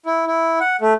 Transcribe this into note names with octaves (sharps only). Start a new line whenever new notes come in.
E4
E4
F#5
A3